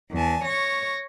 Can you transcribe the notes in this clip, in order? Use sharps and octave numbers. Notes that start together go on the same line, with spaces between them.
E2 G#5 A5
C#5 C#6 A#6